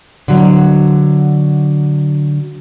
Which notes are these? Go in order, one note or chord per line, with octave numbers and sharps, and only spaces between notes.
D3 F#3